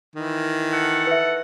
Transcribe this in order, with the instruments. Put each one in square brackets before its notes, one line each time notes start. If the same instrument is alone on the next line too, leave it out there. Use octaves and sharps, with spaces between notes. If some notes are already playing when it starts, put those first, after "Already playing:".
[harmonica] D#3 E3
[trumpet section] A4 F#5
[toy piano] B4 E5